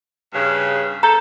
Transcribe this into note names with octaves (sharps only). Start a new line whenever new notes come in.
G2 C#3
A4 A#5 G6